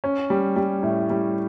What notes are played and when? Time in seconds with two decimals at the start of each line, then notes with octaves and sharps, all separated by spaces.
0.04 C#4
0.30 G3
0.56 G3
0.83 A2
1.10 G3